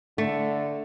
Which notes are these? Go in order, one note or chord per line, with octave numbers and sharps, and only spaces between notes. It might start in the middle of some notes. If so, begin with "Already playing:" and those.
D3 A3